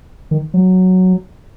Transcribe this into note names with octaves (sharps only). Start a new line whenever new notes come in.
D#3
F#3